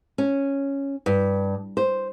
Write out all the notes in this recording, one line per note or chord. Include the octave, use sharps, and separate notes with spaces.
C#4
G2
C5